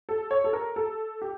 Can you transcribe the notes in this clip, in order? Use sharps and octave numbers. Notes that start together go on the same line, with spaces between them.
A4
C#5
A4
A#4
A4
G4